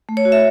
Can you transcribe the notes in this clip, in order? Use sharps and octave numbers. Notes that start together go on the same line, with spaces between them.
A3
C#5
F#4
E5